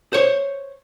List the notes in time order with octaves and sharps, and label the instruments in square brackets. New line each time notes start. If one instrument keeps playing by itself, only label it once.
[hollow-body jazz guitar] C5 C#5